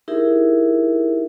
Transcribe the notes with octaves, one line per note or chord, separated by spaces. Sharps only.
D#4 E4 G4 G#4 A#4 E5